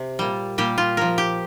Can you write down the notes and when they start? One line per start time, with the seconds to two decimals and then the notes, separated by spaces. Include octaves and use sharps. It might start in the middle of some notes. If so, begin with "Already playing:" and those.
Already playing: C3
0.19 A#2 G3
0.58 A#2 G3 G4
0.78 F4
0.97 A#2 F3 A#4
1.18 G4